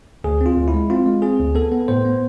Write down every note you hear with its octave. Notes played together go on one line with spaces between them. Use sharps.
D2 G#4
C4
F4
D2
E4
G#3
C4 F4
G#3
C4 G#4
D2
B3 A4
B3
A2 C5
B3